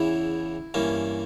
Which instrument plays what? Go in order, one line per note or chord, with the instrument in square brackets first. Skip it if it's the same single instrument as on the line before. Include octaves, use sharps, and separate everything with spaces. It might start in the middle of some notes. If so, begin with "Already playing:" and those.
Already playing: [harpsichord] E2 C#3 E3 E4
G2 E3 A#3 C#4